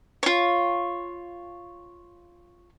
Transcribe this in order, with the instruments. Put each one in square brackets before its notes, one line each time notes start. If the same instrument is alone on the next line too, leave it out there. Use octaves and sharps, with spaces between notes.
[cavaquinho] F4 C#5